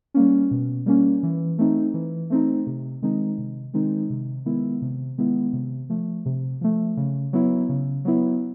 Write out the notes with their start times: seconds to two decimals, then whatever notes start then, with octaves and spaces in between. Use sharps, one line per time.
0.14 G3 A#3 C#4
0.51 B2
0.86 G3 A#3 C#4
1.23 E3
1.58 A3 C4 D#4
1.94 E3
2.30 A3 C4 D#4
2.67 C3
3.02 D#3 G#3 C4 D#4
3.38 C3
3.74 D#3 G#3 C4 D#4
4.10 C3
4.46 D#3 G#3 B3 E4
4.82 C3
5.18 D#3 G#3 B3 E4
5.53 C3
5.90 F3 A3
6.26 C3
6.61 F3 A3
6.97 C#3
7.33 F#3 B3 E4
7.69 C#3
8.05 F#3 B3 E4